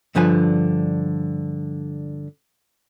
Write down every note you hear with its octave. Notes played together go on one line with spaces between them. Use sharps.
G2 D3 F3 B4 G#5